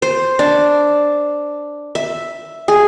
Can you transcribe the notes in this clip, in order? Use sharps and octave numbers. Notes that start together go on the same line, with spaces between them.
C5
D4
E5
G#4